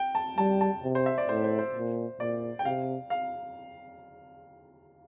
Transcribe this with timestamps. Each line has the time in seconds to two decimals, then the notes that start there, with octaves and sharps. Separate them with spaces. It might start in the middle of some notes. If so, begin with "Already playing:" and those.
Already playing: G5
0.15 A5
0.38 G3 A5
0.61 A5
0.84 C3
0.95 C5
1.06 E5
1.18 D5
1.29 A2 C5
1.44 C5
1.59 C5
1.75 A#2
2.20 A#2 D5
2.59 G5
2.65 C3 F5
3.10 F5